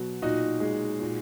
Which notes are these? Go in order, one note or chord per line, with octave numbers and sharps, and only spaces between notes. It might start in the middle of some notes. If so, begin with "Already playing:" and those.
Already playing: B2 F#3
A#2 D#4 F#4
G#3
A#2